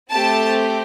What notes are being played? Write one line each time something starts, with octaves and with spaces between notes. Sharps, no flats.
A3 C4 G4 A5